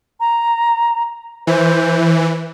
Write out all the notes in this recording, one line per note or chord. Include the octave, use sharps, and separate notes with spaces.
A#5
E3 C5